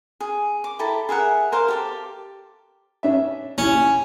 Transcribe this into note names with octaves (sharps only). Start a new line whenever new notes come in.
G#4
D6
E4 G4 A4 A#5
G#4 A#4 E5 F#5
A#4 C5 F5
G4 A4 D6
C#4 D4 E5
C#4 E4 G4